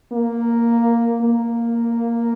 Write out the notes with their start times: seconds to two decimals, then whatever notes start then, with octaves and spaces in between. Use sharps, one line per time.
0.13 A#3
1.22 A#3